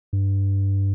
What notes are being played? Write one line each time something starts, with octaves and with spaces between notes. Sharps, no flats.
G2